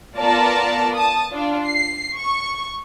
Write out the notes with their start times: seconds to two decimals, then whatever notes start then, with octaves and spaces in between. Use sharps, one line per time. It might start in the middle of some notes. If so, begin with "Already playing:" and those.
0.18 B3 F4 A#4 D5 A5 A#5
0.95 A5 D#6
1.33 D4 F4
1.67 C7
2.16 C#6